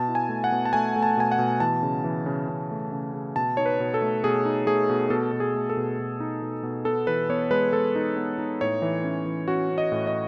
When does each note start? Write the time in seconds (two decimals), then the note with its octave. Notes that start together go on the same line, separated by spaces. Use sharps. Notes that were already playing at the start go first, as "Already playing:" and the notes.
Already playing: B2 A5
0.08 E4
0.15 G#5
0.29 A3
0.44 F#5
0.52 B2
0.65 A5
0.73 A3 G#5
0.96 A3
1.03 A5
1.17 B2 G#5
1.32 F#5
1.38 B2
1.60 E3 A5
1.83 C#3
2.04 E3
2.26 C#3
2.49 C#3
2.71 A3
2.92 C#3
3.14 C#3
3.36 B2 A5
3.57 D#4 C#5
3.66 B4
3.80 B2
3.94 A4
4.02 A3
4.24 B2 G#4
4.45 D#4
4.66 A3 G#4
4.89 B2
5.10 B2 A4
5.32 B2
5.40 G#4
5.54 A3
5.70 A4
5.77 B2
5.99 B2
6.20 D#4
6.42 B2
6.63 B2
6.85 B3 A4
7.07 E3 B4
7.29 B3 C#5
7.51 G#3 B4
7.73 G#3 A4
7.95 D#4
8.17 B3
8.38 D#4
8.61 A2 C#5
8.82 E3
9.04 C#4
9.26 E3
9.48 C#4 F#4
9.71 C#4
9.78 D#5
9.92 A2
10.07 D#5